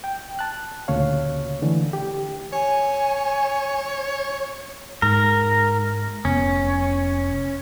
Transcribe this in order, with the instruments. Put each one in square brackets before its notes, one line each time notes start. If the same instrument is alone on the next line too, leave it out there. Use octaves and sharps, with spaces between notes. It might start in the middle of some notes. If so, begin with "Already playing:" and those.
[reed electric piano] G5
A5 F#6
D2 A#2 C#3 C#5 F5
D3 E3 A3
G4
[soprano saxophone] C#5 [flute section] G#5
[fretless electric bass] G#2 [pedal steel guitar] A#4
[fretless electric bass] F1 B3 [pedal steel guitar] C#4